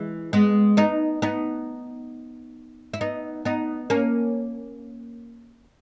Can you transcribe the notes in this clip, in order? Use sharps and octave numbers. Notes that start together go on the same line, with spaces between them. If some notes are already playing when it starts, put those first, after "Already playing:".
Already playing: E3 G#3
G#3 B3
B3 D#4
B3 D#4
E4
B3 D#4
B3 D#4
A#3 C#4